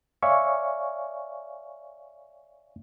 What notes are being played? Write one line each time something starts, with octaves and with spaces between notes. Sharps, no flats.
C#5 D5 E5 F5 G#5 C#6